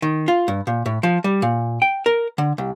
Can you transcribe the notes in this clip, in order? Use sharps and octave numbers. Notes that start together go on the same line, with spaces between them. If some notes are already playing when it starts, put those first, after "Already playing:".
D#3
F4
G2
A#2
A2
F3
G3
A#2
G5
A#4
D3
C2